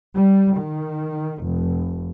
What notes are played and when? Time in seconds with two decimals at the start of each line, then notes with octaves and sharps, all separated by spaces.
0.16 G3
0.57 D#3
1.45 F1